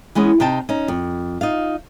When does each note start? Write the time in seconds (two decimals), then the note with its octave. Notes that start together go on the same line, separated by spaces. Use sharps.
0.15 E3 G#3 B3 C#4
0.40 C3 D#4 G5 A5
0.69 C#4 D#4
0.88 F2
1.41 D#4 F4 F5